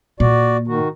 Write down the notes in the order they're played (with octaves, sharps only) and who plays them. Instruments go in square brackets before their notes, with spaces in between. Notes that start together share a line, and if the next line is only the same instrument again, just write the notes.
[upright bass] A#2 [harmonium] F#4 D5
[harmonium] D#3 F#4